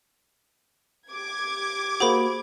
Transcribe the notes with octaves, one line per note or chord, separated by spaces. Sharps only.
G4 D6 G#6
A#3 F#4 G#4 C5 B5